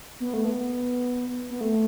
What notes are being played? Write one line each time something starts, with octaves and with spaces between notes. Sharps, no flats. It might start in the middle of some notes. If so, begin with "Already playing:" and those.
B3
A3
B3
B3
A3